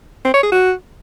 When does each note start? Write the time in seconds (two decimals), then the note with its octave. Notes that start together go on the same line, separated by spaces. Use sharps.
0.25 C4
0.34 C#5
0.43 G#4
0.52 F#4